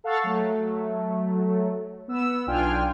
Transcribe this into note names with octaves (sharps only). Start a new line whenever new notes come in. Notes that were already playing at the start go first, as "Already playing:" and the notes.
A4 F5 F#5 C#6 E6 A6
F#3 A3
B3 E6
B1 D4 F4 G5 G#5 F6